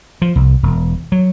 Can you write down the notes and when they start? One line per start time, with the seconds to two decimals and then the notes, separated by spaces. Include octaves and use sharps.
0.22 F3
0.36 C2
0.63 E1
1.12 F#3